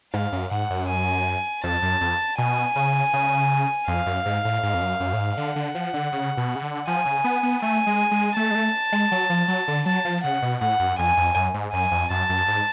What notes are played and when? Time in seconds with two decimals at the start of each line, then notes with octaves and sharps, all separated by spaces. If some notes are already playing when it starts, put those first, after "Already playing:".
0.14 G#2 F5
0.32 F#2
0.51 G#2 F#5
0.70 F#2
0.88 G#5
1.64 F2 A5
1.82 F#2
2.01 F2
2.38 B2 G#5
2.76 C#3
3.13 C#3
3.88 F2 F5
4.06 F#2
4.26 G#2
4.45 A2
4.63 G#2
4.74 F2
4.81 F#2
5.00 F#2
5.13 A2
5.18 G#2
5.37 D3 F#5
5.56 D3
5.75 F3
5.94 D3
6.12 C#3
6.37 B2
6.55 C#3
6.62 D3
6.87 F3 G#5
7.05 C#3
7.24 B3
7.43 B3
7.62 A3 G#5
7.86 G#3
8.11 G#3
8.36 A3 A5
8.51 G#3
8.55 A3
8.92 G#3
9.11 F#3
9.30 F3
9.48 F#3
9.68 D3
9.86 F#3 A5
10.05 F3
10.23 C#3 F#5
10.42 B2
10.61 A2 F#5
10.79 F#2
10.98 F2 G#5
11.17 F2
11.35 F#2
11.54 G#2
11.72 F#2 G#5
11.91 F2
12.10 F#2 A5
12.29 F#2
12.48 G#2